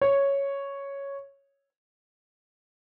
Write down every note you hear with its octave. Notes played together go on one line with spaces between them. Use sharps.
C#5